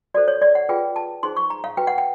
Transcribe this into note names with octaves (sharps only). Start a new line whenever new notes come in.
F#4 A4 C5 D5
C#5
D5
F#5
F4 G#4 B4 G5
A5
D#4 G#4 C5 C6
C#6
A#5
F5
F#4 B4 G5
F#5
G5